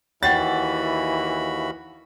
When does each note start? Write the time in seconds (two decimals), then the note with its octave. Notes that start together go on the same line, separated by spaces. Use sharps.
0.23 D#2 E3 F#4 C#5 F#5 G5 B5 A6